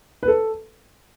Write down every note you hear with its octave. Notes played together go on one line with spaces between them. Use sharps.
B4
A4